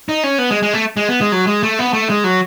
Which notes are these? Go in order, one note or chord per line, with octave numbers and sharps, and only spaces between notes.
D#4
C#4
B3
G#3
G#3
A3
G#3
B3
G#3
F#3
G#3
A3
B3
A3
G#3
F#3